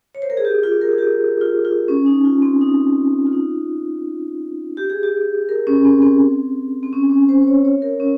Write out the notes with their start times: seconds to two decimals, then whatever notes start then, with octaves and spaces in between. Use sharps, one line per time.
0.15 C#5
0.22 C5
0.30 A#4
0.37 G#4
0.45 G4
0.63 F4
0.81 A#4
0.92 G#4
0.98 G4
1.41 F4
1.65 F4
1.88 C#4
2.06 D#4
2.25 F4
2.42 C4
2.61 D#4
3.27 F4
3.33 D#4
4.77 G4
4.90 G#4
5.03 G4
5.49 A#4
5.67 C#4
5.85 C4
6.02 C4
6.83 C4
6.93 C#4
7.10 C#4
7.29 C5
7.42 C5
7.47 C#5
7.65 C#5
7.82 A#4
8.00 C#4